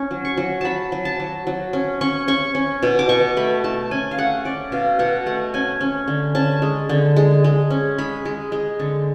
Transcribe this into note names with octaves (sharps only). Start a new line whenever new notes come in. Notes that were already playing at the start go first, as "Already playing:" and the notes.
Already playing: C#4
F#3
C#6
F#3
F#3 A5 B5
F#3
A5
F#3
F#3
C#4
C#4 C#6
C#4 C#6
C#4
B2
D6
B2 C#6
A3 B5
A3 A5
C#4 G#5
F5
A3 F#5
C#4 D5
B2 F5
B2 F#5
A3 F#5
C#4 G#5
C#4
D3
C#4 A5
G#3
D3
G#3
G#3
C#4
G#3 B5
G#3
G#3
D3